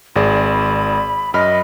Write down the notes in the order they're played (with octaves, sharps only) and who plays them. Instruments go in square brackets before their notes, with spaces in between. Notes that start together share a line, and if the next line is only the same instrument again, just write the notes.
[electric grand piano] G#1 G#4 D5 [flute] B5
[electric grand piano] F#2 B5 F6 [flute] D#5